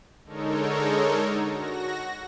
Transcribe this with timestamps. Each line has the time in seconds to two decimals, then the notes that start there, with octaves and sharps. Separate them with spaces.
0.24 D3 G#3 D#4 A4 A#4 C#5
1.51 F#4 A#6